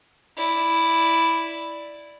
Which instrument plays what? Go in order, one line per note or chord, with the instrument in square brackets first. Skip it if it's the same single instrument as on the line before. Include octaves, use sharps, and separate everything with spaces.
[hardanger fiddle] E4 D5